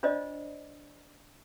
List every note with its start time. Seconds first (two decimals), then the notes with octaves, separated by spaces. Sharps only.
0.03 D4 F4 C5 D5 D#5